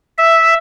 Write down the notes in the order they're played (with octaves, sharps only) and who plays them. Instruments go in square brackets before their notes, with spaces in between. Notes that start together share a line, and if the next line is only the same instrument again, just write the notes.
[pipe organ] E5